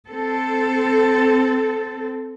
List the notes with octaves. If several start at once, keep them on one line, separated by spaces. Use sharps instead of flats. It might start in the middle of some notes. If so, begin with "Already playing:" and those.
C4 A4